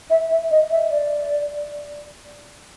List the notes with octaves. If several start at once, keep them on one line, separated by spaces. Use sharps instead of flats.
E5
E5
D#5
E5
D5